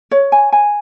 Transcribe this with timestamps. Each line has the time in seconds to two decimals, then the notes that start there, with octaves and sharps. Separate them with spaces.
0.11 C#5
0.32 G#5
0.52 G#5